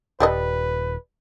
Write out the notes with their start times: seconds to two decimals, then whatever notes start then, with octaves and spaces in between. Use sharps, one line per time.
0.20 D#1 G3 A4 B4 D#5